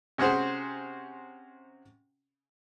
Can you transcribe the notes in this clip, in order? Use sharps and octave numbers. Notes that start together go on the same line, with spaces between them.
C3 C#4 F#4 G#4 C5